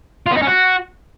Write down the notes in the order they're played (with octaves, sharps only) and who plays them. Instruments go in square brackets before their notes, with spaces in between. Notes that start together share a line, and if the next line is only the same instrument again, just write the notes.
[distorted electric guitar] F4
B3
D#4
C#4
F#4